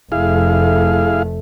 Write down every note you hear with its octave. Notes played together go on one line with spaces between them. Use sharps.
F1 A3 E4 G#4 F5